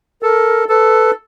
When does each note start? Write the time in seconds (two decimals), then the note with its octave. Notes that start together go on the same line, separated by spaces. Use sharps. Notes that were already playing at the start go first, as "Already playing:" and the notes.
0.21 A4 A#4
0.69 A4 B4